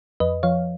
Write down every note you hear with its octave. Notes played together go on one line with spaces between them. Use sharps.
F2 B4 D#5
F3 C#5 F5